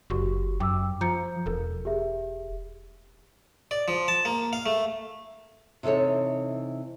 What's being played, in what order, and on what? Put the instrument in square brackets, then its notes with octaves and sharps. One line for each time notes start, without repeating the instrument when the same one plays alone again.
[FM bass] F#1 [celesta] F#4 G4 C#6
[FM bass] F#2 [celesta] G5 D6 E6
[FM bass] F3 [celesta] A#5 G6 C#7
[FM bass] E1 [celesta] A4 A#4
[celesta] G4 G#4 E5
[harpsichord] D5
F3
A5
A#3
F5
A3
[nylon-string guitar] C3 E3 D#4 A4 C#5